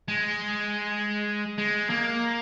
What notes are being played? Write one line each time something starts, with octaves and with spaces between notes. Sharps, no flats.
G#3
G#3
A#3